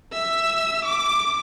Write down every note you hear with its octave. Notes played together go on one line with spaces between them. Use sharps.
E5 E6
D6